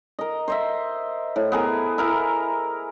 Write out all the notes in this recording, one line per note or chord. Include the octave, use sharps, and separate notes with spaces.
A#4 D#5
C5 D#5 E5
A2
B3 G#4 A#4
E4 A#4